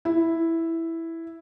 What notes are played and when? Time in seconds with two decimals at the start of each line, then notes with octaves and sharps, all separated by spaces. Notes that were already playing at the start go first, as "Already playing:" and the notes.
0.05 E4